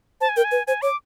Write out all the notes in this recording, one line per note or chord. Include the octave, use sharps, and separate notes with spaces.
C5 A5
G#5
A#4 G5
G#5
B4
C5 G#5
C#5 D6